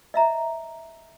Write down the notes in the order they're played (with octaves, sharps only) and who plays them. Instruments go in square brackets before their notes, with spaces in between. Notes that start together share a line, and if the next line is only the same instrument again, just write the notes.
[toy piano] D#5 E5 A#5